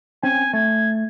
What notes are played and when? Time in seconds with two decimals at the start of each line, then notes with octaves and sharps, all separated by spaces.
0.23 C4 C#4 G#5
0.53 A3 G#6